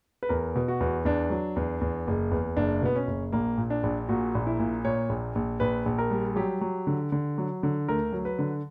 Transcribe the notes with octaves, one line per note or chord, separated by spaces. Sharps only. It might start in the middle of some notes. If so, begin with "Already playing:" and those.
B4
E2 A#4
B2
F#4
E2
E2 D4
F#3
E2
E2
F#1
E2
F#1 D4
B2 B3
C#4
F#1
A#1 A#3
A#2
D4
A#1
A#2 F#4
A#1
E4
A#2
A#2 C#5
A#1
A#1
A#1 B4
A#1
A#4
G3
F#3 G4
F#3
D3
D3
F#3
D3
D2 A#4
F#3
B4
D3